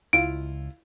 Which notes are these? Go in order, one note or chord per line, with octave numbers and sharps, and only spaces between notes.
C#2 E4 F4 D7